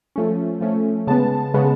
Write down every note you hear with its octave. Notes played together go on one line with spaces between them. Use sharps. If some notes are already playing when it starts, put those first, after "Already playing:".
F3 A3 C#4
F3 A3 C#4
C#3 G#3 B3 A5
C#3 G#3 B3